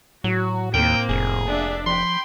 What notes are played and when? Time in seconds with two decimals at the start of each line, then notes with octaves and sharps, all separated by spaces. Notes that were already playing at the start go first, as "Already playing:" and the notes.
0.24 A2 F#3 F#4
0.74 D#2 A#3 C4 G5
1.09 F1 G#4
1.46 D4 E5
1.86 F3 G5 B5 C6